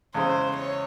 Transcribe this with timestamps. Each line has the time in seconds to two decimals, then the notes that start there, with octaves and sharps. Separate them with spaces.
0.14 E2 C#3 G#3 C5
0.55 C#5